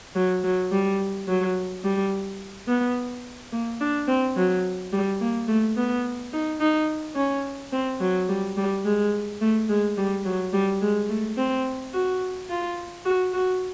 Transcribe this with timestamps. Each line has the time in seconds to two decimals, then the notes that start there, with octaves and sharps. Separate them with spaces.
0.15 F#3
0.44 F#3
0.72 G3
1.28 F#3
1.84 G3
2.68 B3
3.52 A#3
3.81 D4
4.08 C4
4.36 F#3
4.93 G3
5.21 A#3
5.48 A3
5.77 B3
6.33 D#4
6.60 D#4
7.16 C#4
7.72 C4
8.01 F#3
8.29 G3
8.57 G3
8.85 G#3
9.41 A3
9.69 G#3
9.97 G3
10.25 F#3
10.53 G3
10.81 G#3
11.09 A3
11.37 C4
11.93 F#4
12.49 F4
13.05 F#4
13.33 F#4